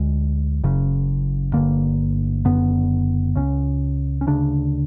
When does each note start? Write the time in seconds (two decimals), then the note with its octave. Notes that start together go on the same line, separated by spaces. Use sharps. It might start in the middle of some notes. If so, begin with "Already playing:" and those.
Already playing: D2 D3 G#3
0.64 F#1 F#2 C#3
1.53 G1 G2 D3 A#3
2.45 F#1 F#2 D3 B3
3.35 C#2 C#3 C#4
4.21 C#4
4.27 D2 C#3 D4